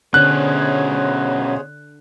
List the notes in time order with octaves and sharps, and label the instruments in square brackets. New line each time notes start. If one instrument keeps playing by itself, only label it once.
[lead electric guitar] B2 C#4 [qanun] D3 [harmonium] G#4 C5 C#5 [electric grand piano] F#6